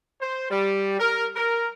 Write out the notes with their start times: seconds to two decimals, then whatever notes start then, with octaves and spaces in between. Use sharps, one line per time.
0.21 C5
0.49 G3
0.99 A#4
1.36 A#4